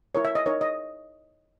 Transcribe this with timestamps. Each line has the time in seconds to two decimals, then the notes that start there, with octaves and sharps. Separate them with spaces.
0.15 E4 A#4 C#5
0.25 E5
0.35 D#5
0.46 D#4 A#4 C#5
0.61 D#5